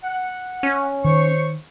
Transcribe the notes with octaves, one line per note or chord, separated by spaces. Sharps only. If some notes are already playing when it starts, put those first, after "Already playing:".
F#5
C#4
D#3 C5 C#5 C#6